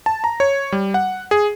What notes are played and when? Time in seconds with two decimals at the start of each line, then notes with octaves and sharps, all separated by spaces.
0.06 A5
0.24 A#5
0.40 C#5
0.72 G3
0.94 F#5
1.31 G#4